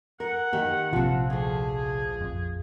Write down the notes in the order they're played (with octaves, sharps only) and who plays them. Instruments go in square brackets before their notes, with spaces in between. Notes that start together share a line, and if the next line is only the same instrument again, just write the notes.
[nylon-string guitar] A#4 [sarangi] F#5
[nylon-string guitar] D#3 G4 A#4 [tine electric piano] A#3
[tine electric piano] A#1 F4 [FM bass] C3 [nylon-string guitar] F3 C4
[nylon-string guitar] D2 F3 [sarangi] G#4
[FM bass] F2